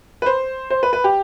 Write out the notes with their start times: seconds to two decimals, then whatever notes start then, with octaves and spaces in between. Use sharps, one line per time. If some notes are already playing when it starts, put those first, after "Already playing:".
0.22 B4
0.26 C5
0.70 C5
0.83 B4
0.93 B4
1.04 G4